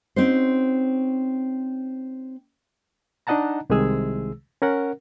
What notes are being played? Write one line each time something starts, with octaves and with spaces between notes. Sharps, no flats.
C4 C#4 D#4 F#4 C5
D4 D#4 D#5 F#5 A5 A#5
C2 C3 D#3 G#3 G#4 E6
C#4 A#4 F#5